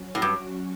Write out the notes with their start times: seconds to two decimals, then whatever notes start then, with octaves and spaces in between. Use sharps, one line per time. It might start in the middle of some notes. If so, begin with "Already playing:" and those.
Already playing: F#3 C#4 F#4
0.15 A2
0.22 G2